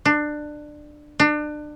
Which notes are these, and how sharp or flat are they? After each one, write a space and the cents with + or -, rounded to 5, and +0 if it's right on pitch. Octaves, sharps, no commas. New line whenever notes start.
D4 +20
D4 +30